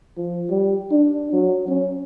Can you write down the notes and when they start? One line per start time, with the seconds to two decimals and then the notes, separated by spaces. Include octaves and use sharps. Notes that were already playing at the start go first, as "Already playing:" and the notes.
0.17 F3
0.50 G3
0.91 D4
1.33 F#3
1.68 C#4